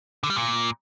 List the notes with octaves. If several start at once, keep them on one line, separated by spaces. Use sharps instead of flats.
D3
G3
A#2